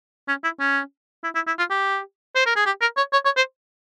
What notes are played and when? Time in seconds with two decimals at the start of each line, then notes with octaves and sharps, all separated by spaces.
0.29 C#4
0.44 E4
0.60 C#4
1.24 E4
1.35 E4
1.47 E4
1.59 F4
1.71 G4
2.36 C5
2.46 A#4
2.56 G#4
2.66 G4
2.81 A#4
2.97 C#5
3.13 C#5
3.25 C#5
3.37 C5